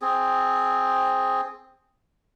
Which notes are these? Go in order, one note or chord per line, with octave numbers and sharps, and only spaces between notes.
C4 G#4